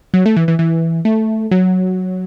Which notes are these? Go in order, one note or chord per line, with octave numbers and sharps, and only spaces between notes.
F#3
A3
E3
E3
E3
A3
F#3